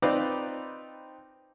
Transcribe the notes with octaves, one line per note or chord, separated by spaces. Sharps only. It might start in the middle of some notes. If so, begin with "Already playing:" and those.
C4 D#4 F4 B4 C5 D5